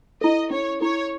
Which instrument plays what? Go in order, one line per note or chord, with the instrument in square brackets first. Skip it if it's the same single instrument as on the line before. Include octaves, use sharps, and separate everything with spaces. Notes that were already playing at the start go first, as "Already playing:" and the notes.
[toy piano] E4 A4 [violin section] D#5
[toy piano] C#4 [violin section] C#5
[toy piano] E4 A4 [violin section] C#5